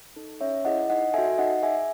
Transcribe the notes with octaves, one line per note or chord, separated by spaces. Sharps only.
D#4 A4
C#4 C#5 E5
E4 G#4 D#5 F#5
D#4 D#5 F#5
F#4 A4 E5 G#5
D#4 D#5 F#5
G#4 E5 G#5